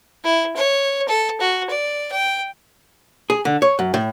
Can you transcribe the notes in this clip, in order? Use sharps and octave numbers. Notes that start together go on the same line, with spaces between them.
E4
C#5
A4
F#4
D5
G5
G#4
D3
C#5
F#2
A2